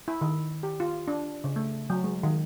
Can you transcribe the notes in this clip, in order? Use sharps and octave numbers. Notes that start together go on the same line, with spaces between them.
E4
D#3
G4
F4
D4
C#3
A3
F#3
G#3
D#3